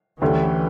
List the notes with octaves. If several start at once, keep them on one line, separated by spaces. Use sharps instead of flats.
D2 D3 E3 A3 C#4 G4